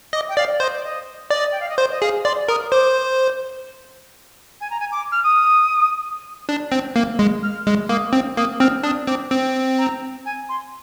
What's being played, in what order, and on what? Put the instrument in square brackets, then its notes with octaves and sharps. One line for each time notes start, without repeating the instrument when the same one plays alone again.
[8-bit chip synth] D#5 [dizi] D6
[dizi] G5
[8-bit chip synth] D5 [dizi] F5
[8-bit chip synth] C5 [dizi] D#5
[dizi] D5
D#5
[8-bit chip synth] D5 [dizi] D#5
[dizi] G5
F5
D#5
[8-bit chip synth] C5 [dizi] D5
[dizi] D#5
[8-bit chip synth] G#4 [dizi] F5
[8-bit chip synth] D5 [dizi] C6
[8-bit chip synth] A#4 [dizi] D#6
[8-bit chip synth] C5 [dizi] D6
[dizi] G#5
A#5
G#5
D6
F6
D#6
[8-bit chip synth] D4
C4
A#3
G#3
[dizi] F6
[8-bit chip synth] G#3
[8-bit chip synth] A#3 [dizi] D#6
[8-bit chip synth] C4
[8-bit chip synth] A#3 [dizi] D#6
[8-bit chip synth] C4 [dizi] F6
[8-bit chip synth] D4 [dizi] D#6
[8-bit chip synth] C4 [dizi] D6
[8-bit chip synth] C4
[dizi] A#5
G#5
C6